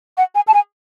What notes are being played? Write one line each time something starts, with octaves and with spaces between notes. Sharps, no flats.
F#5
G#5
A5
G#5